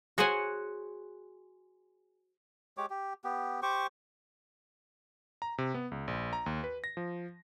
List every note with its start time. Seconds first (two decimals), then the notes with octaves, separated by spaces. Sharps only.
0.18 F#4 G#4 C5 C#5 F#5 G#5
2.77 G#3 G4 C#5 D6
2.90 G4
3.24 B3 G4
3.62 G4 C5 C#6 D6
5.42 A#5
5.58 C3
5.74 B3
5.91 C#2
6.08 A#1
6.33 A#5
6.46 D#2
6.64 B4
6.84 A#6
6.97 F3